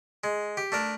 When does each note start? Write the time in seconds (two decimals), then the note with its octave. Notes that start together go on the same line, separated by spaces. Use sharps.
0.24 G#3
0.57 G4
0.72 A3 D4 A#4